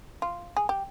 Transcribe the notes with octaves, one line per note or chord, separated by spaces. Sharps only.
F4
G#4
G4